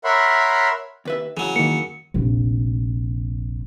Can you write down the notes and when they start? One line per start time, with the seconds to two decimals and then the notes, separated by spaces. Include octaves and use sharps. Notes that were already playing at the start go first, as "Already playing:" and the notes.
0.04 A#4 C#5 E5 F#5 B5 C6
1.05 D#2 B4 E5
1.37 C#3 E3 F#3
1.56 D#3 A#3 C#7
2.14 F1 A#1